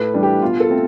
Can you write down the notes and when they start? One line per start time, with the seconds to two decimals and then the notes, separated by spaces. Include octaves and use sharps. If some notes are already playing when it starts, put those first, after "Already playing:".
Already playing: A2 B4
0.13 E3 G3 D4
0.23 G4
0.42 B2 F4
0.60 A4
0.69 A3 C4